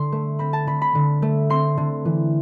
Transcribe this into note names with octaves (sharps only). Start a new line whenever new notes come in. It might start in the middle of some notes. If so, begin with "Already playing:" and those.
Already playing: D3 C6
A3
C4 B5
A5
D3 B5
B5
D3
A3
C4 C6
D3
E3